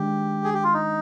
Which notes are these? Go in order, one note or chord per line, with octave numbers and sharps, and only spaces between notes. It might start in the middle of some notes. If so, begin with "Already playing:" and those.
Already playing: D#3 G#3 D4 G4
G#4
G4
F4
D#4